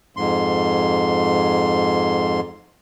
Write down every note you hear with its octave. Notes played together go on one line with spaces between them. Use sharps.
F2 G#2 C6